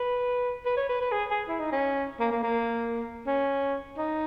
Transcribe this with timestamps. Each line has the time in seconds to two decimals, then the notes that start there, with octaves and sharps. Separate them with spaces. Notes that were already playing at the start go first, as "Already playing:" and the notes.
Already playing: B4
0.66 B4
0.77 C#5
0.89 B4
1.01 B4
1.12 G#4
1.31 G#4
1.48 E4
1.60 D#4
1.72 C#4
2.20 A#3
2.31 A#3
2.43 A#3
3.27 C#4
3.97 D#4